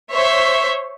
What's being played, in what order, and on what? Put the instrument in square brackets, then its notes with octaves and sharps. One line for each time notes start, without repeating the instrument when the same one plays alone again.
[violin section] C5 C#5 E5